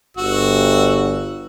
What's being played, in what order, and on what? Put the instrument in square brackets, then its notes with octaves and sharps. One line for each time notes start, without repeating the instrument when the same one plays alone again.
[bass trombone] G1 [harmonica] F#4 E6